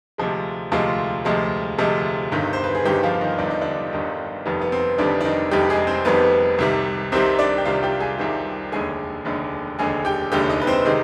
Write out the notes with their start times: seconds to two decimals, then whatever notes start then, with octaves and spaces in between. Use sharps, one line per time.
0.18 D2 C3 F3 G#3
0.72 D2 C3 F3 G#3 F4
1.25 D2 C3 F3 G#3
1.78 D2 C3 F3 G#3
2.32 G1 G2 D#3
2.53 C5
2.64 B4
2.75 G#4
2.85 G1 G2 D#3 G3 G4
3.03 F3 F4
3.21 D#3 D#4
3.38 G1 G2 D#3 D4
3.50 D#4
3.61 D3 D4
3.93 G1 G2 D#3
4.46 F1 F2 D#3 G3 B3
4.61 B3
4.72 C4
4.98 F1 F2 D3 D#3 G3 D4
5.21 D4
5.25 D#3 D#4
5.51 F1 F2 D#3 G3 G4
5.70 G#3 G#4
5.87 C4 C5
6.05 F1 F2 D#3 G3 B3 B4
6.58 C2 C3 D#3 G3
7.12 C2 C3 D#3 G3 C4 C5
7.39 D4 D5
7.58 G5
7.65 C2 C3 D#3 G3 F4 F5
7.83 G4 G5
8.00 G#4 G#5
8.18 C2 C3 D#3 G3
8.72 F1 D#2 D3 G#3 G#4 G#5
9.25 F1 D#2 D3 G#3
9.79 F1 D#2 D3 G#3 G#4 G#5
10.05 G4 G5
10.32 F1 D#2 D3 G#3 G4 G5
10.49 D#4 D#5
10.61 B4
10.67 C4 C5
10.85 C3 D#3 G#3